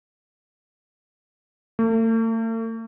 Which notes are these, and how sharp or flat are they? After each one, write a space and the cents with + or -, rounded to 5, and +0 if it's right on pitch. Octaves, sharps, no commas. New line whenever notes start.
A3 +45